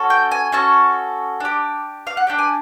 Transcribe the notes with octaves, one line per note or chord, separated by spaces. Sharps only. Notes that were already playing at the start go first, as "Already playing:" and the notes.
Already playing: C#4 F#4 A4
G5
G#5
C#4 F#4 A4 A5
D4 G4
F5
F#5
D4 G4 G5
G#5